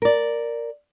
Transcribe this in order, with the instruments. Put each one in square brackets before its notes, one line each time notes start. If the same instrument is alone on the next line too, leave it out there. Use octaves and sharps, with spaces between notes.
[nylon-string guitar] A#4 D5